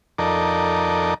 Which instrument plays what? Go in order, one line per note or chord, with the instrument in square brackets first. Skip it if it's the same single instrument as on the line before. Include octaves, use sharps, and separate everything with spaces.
[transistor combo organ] F2 D#4 A4 A#4 D5